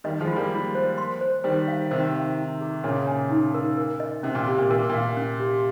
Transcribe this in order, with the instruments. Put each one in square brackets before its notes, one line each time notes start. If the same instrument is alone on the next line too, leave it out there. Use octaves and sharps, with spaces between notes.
[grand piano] D#3 G3 [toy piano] D#5
[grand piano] F3 G#3
[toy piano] F4
[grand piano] G3 A#3
[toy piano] F4
C5
C6
C5
[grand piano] D#3 G3 [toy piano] C5
[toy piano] F5
[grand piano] C3 D#3 [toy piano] C5
[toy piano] F5
D#4
G#4
[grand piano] A#2 C#3 [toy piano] C#5
[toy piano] G#5
D#4
A#4
A#4
D#5
[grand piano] C3 [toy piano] C#4
[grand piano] A#2
[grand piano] C3 [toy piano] G4
[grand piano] A#2
[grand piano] A#2 [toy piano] A#4
[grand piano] A#2 [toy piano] F5
[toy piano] C#4
G4